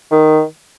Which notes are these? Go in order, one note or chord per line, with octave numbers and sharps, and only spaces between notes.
D#3